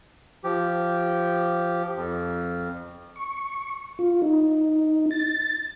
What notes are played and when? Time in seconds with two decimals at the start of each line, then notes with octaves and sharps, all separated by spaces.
0.44 F3 G4
1.96 F2
3.16 C#6
3.99 F4
4.22 D#4
5.11 A6